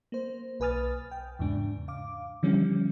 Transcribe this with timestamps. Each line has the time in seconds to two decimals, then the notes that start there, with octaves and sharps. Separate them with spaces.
0.12 A#3 C5
0.60 B1 B4 G#5 D#6 F6 A6
1.11 G5
1.39 E2 G#2 C#3 D4
1.88 F5 D6
2.43 D3 E3 F3 G3 C#4